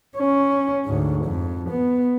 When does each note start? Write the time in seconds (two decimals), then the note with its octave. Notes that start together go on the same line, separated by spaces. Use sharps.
0.18 C#4
0.85 D2 G#2
1.24 F2
1.70 B3